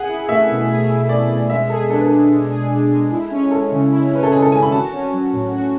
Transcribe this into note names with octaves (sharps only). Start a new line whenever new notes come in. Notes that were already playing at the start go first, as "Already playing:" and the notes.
Already playing: G#4 F#5
E4
A3 E5
B2
G#4
E4
A3 D5
B2
D5
G#3 E5
G#4 A4
D4 A4
B4
G#3 A4
G#3
G#4
D4
G#3
E4
C#4
G#3 A4
C#3
E4
C#4 B4
A4
G#3 G#4
A4
C#3 G#5
B5
F#4 A5
C#4
F#3
A2
F#4